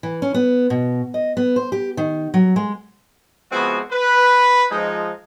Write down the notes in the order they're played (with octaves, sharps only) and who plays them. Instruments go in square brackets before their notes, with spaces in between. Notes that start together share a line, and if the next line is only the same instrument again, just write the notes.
[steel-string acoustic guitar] E3
C#4
B3
B2
D#5
B3
C5
G4
D#3
F#3
G#3
[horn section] F3 G#3 B3 C4 E4 F#4
B4
F3 G#3 D#4